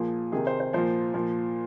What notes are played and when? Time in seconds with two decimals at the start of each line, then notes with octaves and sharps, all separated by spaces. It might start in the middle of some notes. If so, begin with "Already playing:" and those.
Already playing: A#2 F3 G#4
0.32 C3 D#3 G#4
0.47 C5
0.60 C5
0.73 A#2 F3 C5
1.14 A#2 F3